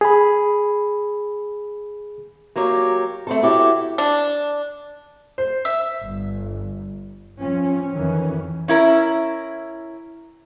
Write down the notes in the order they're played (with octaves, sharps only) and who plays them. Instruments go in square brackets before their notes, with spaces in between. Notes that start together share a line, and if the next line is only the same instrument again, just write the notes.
[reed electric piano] G#4 B5
[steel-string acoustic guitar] F#3 A#3 G4 C#5
A3 C4 A4
E4 F#4 G4 A4 C#5
[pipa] D4
[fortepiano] C5
[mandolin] E5
[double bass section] G1
F3 C4 C#4
F2 D#3 E3 C#4
[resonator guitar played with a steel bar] C#4 E4 A#4